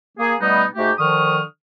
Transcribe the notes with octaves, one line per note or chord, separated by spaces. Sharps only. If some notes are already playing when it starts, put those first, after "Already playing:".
A#3 G#4
B2 G3 A3 B3 D#4
G#2 A3 F#4 G4
D3 D#3 F3 C#6 D#6 F6